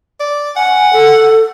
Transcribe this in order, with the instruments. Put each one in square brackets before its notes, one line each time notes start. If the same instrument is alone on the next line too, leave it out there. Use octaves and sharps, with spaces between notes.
[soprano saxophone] D5
[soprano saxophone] F#5 [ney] G#5
[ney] A4